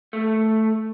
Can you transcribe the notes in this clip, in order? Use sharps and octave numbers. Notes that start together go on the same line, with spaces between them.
A3